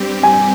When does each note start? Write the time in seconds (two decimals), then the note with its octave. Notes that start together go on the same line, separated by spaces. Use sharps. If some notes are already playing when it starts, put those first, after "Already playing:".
Already playing: G2 G3 C4 G4
0.23 G#5